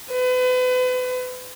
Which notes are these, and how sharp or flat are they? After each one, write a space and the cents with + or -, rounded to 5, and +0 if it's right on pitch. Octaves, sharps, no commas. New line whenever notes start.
B4 +35